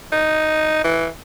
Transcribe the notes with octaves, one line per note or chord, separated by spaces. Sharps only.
D#4
E3